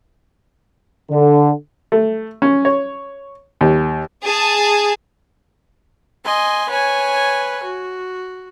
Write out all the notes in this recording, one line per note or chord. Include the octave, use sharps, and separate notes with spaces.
D3
A3
C#4
C#5
D#2
G#4 A5
D#5 G#5 C6
B4 C#5 G#5
F#4